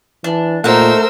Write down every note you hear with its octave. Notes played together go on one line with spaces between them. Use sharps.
E3 D4
A#2 A3 D#4 A#4 C5 F#5 E6